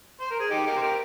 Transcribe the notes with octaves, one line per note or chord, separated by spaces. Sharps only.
C5
A#4
G#4
D#4 G4
G4 A#4
C5
G4 A#4